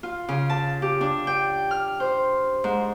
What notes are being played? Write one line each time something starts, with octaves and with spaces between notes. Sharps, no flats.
F4
C#3
A5
G4
D4
G5
F6
C5
G#2